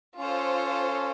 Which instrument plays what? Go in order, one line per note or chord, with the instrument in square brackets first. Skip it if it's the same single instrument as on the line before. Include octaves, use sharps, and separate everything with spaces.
[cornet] C#4 [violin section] F4 A4 C5